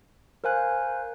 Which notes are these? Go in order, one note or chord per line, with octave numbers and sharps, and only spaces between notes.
A#4 C5 F5 G#5 F#6